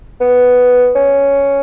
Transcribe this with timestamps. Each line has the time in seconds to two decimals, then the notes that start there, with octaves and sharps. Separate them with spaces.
0.21 B3
0.95 C#4